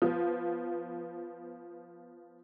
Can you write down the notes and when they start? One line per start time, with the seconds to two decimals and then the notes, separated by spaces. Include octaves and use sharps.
0.02 F3 B3